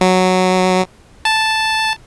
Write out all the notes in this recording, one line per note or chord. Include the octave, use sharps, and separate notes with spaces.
F#3
A5